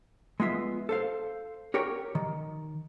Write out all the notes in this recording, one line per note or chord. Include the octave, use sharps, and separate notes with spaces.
G#3 B3 F4 E5
A4 C5 F5
G4 A#4 C#5 F#5 G5
D#3